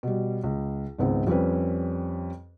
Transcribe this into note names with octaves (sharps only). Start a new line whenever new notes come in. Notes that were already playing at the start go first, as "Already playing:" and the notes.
B2 G3
C#2
G#1 C#2 B3 C4
F2 G3 C4 C#4 B4